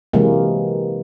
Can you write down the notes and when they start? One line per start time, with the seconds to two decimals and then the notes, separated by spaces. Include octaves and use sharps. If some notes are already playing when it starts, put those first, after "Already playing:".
0.13 C3 E3 F#3 G#3 A#3